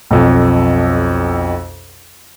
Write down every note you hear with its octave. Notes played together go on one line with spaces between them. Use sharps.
B1 F2